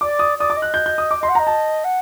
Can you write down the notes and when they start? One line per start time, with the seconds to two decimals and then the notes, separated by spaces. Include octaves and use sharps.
0.01 D5 D6
0.19 D#6
0.38 D5 D#6
0.50 D6
0.56 D#5
0.62 F#6
0.74 G6
0.86 G6
0.98 D#6
1.11 D6
1.20 D#5 C6
1.29 F#5
1.35 D#5 A#5
1.47 A5
1.84 F#5